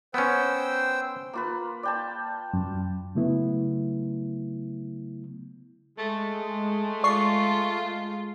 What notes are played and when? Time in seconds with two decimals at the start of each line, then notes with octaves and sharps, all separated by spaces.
0.14 B3 C#4 C5 G5 E6
1.33 A#3 F4 B4
1.83 D5 G5 A5
2.53 F#2
3.15 C#3 F#3 A3 B3 E4
5.99 G#3 A3
7.04 F4 D5 C#6 C7